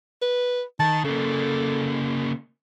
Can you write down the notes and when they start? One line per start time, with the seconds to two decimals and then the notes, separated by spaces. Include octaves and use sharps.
0.22 B4
0.80 D#3 A5
1.05 C#3 A#3 A4